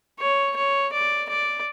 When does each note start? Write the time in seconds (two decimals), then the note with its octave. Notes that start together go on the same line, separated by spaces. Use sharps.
0.20 C#5
0.56 C#5
0.93 D5
1.29 D5